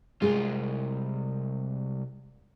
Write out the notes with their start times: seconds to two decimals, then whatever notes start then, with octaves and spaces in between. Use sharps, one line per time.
0.22 C2 G#3 F4 G#4